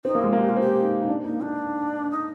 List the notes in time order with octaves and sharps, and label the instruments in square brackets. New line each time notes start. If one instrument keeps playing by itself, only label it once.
[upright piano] C4 [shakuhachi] D#4
[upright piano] A#3
[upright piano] G#3 [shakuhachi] F4
[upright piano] A#3
[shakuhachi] G4
F4
[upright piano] C4
[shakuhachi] G4
[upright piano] D#4
D#4
D4
[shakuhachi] A#3 [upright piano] D#4
[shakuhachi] D4 [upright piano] D#4
[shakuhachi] D#4